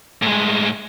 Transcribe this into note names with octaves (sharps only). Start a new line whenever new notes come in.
A2 G#3